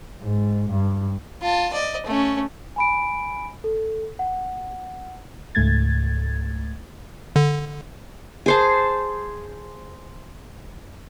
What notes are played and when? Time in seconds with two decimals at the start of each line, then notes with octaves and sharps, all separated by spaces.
0.22 G#2
0.70 G2
1.42 F4 A5
1.73 D5 D#5
2.06 A3 C#4
2.76 G#5 B5 D7
3.64 A4
4.19 F#5
5.55 C#2 G#2 A3 G#6 A6
7.36 D3
8.46 G#4 C5 A5